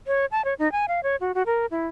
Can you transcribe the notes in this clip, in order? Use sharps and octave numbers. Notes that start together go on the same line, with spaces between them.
C#5
A5
C#5
D#4
G#5
F5
C#5
F#4
F#4
A#4
E4